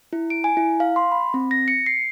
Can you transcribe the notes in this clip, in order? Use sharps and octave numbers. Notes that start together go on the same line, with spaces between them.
E4
D7
G#5
E4
F5
C6
B5
C4
A#6
C#7
C7